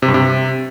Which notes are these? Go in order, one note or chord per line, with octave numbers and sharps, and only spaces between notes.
C3
G2
C3